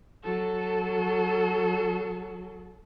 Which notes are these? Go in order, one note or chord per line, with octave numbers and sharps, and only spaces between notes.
F#3 A4